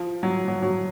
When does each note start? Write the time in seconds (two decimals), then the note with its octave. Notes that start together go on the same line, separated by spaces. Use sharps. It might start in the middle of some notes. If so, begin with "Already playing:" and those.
Already playing: F3
0.23 F#3
0.48 F#3
0.63 F#3